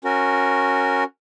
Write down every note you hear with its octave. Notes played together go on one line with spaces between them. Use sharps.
C#4 F#4 A#4